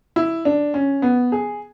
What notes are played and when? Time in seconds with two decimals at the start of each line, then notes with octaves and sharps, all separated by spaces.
0.16 E4
0.45 D4
0.74 C#4
1.02 B3
1.32 G#4